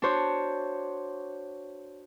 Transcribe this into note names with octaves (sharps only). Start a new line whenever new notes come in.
D4 F#4 C5 C#5